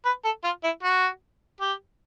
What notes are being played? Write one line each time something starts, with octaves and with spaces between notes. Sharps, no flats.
B4
A4
F4
E4
F#4
G4